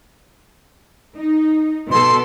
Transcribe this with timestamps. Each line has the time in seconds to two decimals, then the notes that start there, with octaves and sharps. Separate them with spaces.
1.17 D#4
1.91 B2 A4 C6